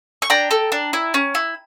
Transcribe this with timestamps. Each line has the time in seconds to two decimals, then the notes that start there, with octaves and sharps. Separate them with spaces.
0.22 C#6
0.30 D4 G5 A#5
0.51 A4
0.72 D4
0.93 E4
1.14 C#4
1.35 E4